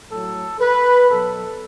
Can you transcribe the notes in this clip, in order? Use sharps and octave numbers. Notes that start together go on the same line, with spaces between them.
A2 F#3 A4
B4
B2 F#3 A4